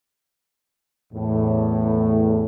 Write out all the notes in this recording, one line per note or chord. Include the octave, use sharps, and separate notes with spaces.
E2 A2